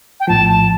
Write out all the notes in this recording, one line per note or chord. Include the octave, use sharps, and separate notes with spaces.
G5
A#1 A2 F3 A5
A5